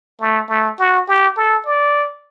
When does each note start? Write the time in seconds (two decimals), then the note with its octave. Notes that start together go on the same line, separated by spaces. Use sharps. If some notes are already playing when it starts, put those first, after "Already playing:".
0.20 A3
0.49 A3
0.79 F#4
1.08 G4
1.37 A4
1.66 D5